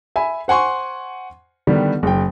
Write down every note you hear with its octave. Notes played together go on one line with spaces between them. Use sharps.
E5 G#5 B5
C5 F#5 G#5 C6 C#6
D3 D#3 G3 B3
F#1 G5